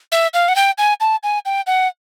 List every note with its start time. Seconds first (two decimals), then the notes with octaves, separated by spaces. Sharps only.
0.12 E5
0.34 F5
0.48 F#5
0.56 G5
0.78 G#5
1.00 A5
1.23 G#5
1.45 G5
1.67 F#5